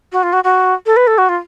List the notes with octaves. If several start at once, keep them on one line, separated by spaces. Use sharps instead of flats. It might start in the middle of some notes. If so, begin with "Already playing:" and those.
F#4
F4
F#4
F#4
A4
B4
A4
F#4
F4